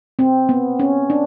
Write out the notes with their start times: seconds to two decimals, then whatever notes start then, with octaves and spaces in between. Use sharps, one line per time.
0.19 C4
0.49 B3
0.80 C#4
1.10 D4